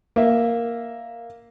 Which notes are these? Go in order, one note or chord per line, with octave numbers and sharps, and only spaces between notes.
A#3 E5